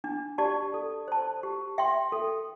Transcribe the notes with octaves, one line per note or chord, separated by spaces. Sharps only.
D4
G4 D5 A5
A4
C5 A5
G4
E5 G5 C6
A4